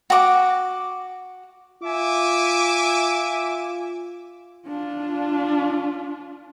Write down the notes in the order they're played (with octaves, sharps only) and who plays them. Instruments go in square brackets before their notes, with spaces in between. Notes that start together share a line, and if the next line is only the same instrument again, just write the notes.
[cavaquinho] F#4 D6
[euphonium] F4 [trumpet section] E5 G#5 D6
[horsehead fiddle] D4 F4